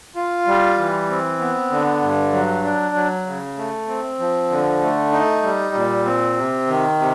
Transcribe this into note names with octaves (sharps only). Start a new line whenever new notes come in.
F4
G3
E3
C4
B3
D3
G2
F#3
D4
F#3
C#3
A3
C4
F3
D3
A3
D#4
G3
A#2
C4
C3
D#3
C3